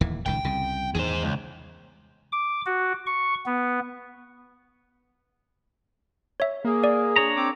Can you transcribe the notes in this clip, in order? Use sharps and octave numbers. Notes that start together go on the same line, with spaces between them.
D1 D#2 E3
D#1 C#2 D#3 G5
C2 C#3
E2 D#3 G#4 C5
C#2
D6
F#4
C#6
B3
C#5 E5
A#3 G#4
D5
D4 C#5 A#5
C4 D6